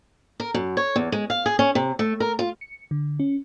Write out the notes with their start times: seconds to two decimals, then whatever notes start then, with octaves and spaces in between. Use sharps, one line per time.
0.40 A#4
0.54 F#2
0.77 C#5
0.96 E2
1.12 G#3
1.30 F5
1.46 G#4
1.59 C#4
1.75 C3
1.99 A3
2.20 A#4
2.39 F4
2.61 C#7
2.91 D3
3.20 C#4